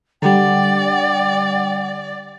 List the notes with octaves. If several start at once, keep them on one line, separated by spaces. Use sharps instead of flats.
D3 G3 D5 F#5 G5